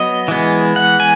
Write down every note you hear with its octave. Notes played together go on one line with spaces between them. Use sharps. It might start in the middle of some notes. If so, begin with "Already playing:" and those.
Already playing: F#3 B3 D#5
E3 G#3 B3
F#5
G#5